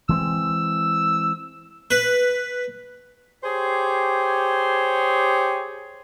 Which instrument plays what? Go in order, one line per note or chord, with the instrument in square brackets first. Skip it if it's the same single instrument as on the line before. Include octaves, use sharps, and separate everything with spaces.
[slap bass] E3 G#3 C4 [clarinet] E6
[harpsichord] B4
[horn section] G4 G#4 C5 C#5